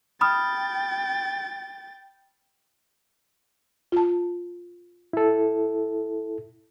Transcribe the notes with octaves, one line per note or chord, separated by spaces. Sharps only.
G5 B5 D#6 F6 A6
F4 A5
E4 A4